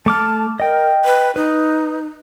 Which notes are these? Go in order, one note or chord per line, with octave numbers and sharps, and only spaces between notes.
A3 A5 D6 F6
A#4 D#5 G5
B4
D#4 B4